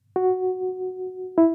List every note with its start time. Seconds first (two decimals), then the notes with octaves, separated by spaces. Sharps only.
0.16 F#4
1.38 E4